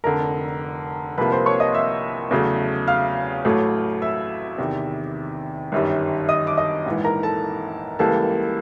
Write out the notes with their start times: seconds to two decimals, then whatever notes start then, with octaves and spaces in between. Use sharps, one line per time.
0.04 F1 F2 D3 A#4 A#5
1.18 C2 C3 F3 A#3 B4 B5
1.32 C5 C6
1.46 C#5 C#6
1.60 D#5 D#6
1.74 E5 E6
2.31 E2 C#3 F#3 A3
2.88 F5 F6
3.45 A1 A2 F#3 A3
4.02 E5 E6
4.58 E2 C3 D#3
5.72 G1 F#2 D#3 G3
6.29 D#5 D#6
6.47 D6
6.57 D#5 D#6
6.86 A#1 G#2 E3
7.04 A#4 A#5
7.23 A4 A5
7.99 C#2 C#3 E3 G3 A#3 A4 A5